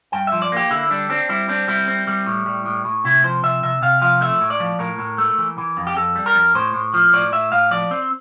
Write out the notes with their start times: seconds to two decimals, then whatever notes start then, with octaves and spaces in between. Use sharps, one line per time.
0.12 G2 G5
0.27 F3 E5
0.42 D5
0.52 A#3 G4
0.71 D3 E4
0.90 G3 D4
1.10 C4 D4
1.29 G3 E4
1.49 C4 D4
1.68 G3 E4
1.88 C4
2.07 G3
2.27 A2
2.46 G3
2.65 A2
2.85 A2
3.04 C3 E4
3.24 F3 C5
3.43 C3 E5
3.63 C3 E5
3.82 C3 F5
4.01 F3 F5
4.21 A3 E5
4.41 A2
4.50 D5
4.60 F3
4.79 A2 A#4
4.99 A2
5.18 A3
5.38 E3
5.58 E3
5.77 F2
5.87 G4
5.96 F2 A4
6.16 G3
6.26 A#4
6.35 F2
6.55 A2 C5
6.74 A2
6.94 F3
7.13 A2 D5
7.32 A2 E5
7.52 A2 F5
7.71 F3 D5
7.91 C4